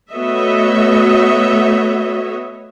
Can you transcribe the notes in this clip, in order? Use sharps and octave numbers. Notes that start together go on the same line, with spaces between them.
A3 B3 F#4 C#5 D#5 E5